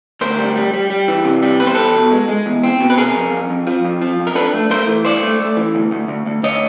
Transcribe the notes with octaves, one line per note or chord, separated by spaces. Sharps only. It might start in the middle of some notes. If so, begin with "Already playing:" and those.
D2 A#4 C5
G3
G3
G3
G3
E3
C3
G3
E2 B4
C5
E2 A4 B4
B2
G#3
G#3
E2
C4
B2
B4
C3 G#4 A#4
F2
F2
F2
F3
F2
F3
F2
A#4
D4 A4 B4
A3
A3 A#4 C5
E3
G2 C5 D5
A3
A3
E3
D2
D2
D2
D2
D2 C#5 D#5